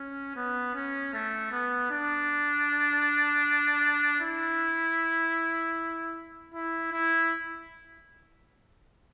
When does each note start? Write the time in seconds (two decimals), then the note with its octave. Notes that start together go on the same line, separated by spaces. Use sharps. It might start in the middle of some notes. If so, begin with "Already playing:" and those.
Already playing: C#4
0.36 B3
0.74 C#4
1.13 A3
1.51 B3
1.91 D4
4.21 E4
6.54 E4
6.92 E4